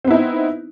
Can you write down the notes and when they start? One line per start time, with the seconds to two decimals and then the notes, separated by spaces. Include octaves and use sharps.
0.04 C4
0.08 B3
0.11 E4
0.14 D#4